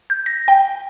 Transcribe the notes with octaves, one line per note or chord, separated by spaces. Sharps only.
G6
A#6
G5